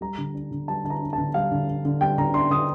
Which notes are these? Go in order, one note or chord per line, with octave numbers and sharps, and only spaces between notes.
G3 A#5
D3
D4
D3
G3 A5
D3 A5
A#5
D4
A5
D3
G3 F5
D3
D4
D3
G3 G5
D3 A#5
D4 C6
D3 D#6